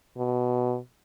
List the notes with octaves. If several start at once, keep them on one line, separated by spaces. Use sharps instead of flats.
B2